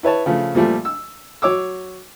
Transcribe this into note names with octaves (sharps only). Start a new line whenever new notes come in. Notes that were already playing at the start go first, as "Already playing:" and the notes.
E4 B4 C#5 A5
C#3 F3 A3
A#2 F3 G3 A3
E6
F#3 C#5 D6 E6